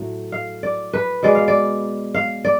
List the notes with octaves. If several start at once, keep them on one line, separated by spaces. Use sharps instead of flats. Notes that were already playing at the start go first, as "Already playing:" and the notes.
Already playing: A2 F#3 A3
F5
D5
B4
B2 G#3 D5
F5
D5
F5
D5